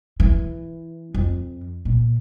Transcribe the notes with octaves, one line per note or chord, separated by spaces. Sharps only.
E3
F2
A#2